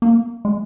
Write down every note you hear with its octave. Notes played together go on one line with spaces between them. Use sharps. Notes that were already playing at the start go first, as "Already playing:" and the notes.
A#3
G#3